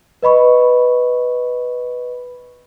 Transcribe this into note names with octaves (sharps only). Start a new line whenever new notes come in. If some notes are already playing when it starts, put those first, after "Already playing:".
B4 D#5 B5 C#6